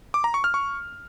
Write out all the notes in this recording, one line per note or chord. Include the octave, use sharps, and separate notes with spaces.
D6
A#5
C#6
F6
C#6